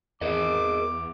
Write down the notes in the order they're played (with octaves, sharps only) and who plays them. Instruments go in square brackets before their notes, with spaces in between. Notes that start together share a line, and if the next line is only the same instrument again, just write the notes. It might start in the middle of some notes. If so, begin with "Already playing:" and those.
[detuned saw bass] E2 [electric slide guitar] G#4 A#4 D#5 [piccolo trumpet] D6